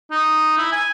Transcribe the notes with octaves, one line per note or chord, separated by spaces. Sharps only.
D#4
E4
G#5